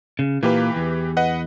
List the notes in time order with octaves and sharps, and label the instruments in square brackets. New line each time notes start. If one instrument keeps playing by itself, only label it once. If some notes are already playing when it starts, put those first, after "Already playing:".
[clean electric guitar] C#3
[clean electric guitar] A#2 A#3 [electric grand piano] E3 G4 B4
[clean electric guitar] E2
[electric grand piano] B4 D#5 F#5